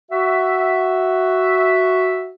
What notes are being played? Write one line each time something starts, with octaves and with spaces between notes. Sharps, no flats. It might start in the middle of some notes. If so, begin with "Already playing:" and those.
F#4 E5